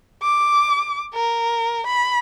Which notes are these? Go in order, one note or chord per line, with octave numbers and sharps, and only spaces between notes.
D6
A#4
B5